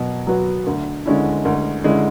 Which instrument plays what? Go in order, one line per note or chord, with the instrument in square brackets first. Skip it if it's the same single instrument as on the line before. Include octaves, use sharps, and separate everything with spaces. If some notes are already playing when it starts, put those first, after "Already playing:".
Already playing: [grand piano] B2 F#3
F#3 B3 F#4
D2
D3 G#3 C#4 E4
D2
D3 G#3 C#4 E4